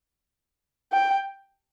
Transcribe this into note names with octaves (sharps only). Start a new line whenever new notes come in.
G5